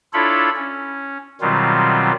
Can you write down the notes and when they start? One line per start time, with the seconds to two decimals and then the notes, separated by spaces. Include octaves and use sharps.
0.13 D4 E4 F4 A4 C#5 B5
0.56 C#4
1.41 B2 D#3 F#3 G3 C4 F4